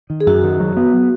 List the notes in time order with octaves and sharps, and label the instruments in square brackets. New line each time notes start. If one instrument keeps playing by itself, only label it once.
[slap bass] D#3
[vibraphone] G#4
[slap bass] F#2 [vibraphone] F#4
[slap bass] D#3
F#3
B3